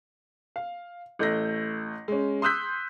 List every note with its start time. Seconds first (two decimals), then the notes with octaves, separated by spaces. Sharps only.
0.56 F5
1.19 A1 A3 G6 A#6
2.08 G#3 C#4
2.42 C6 D#6 E6 F#6 G6 B6